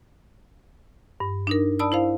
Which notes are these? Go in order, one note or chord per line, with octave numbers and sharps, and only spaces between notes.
G2
D4 D#4 A#4
D5 A5 B5 D#6 E6
E4 C5 F5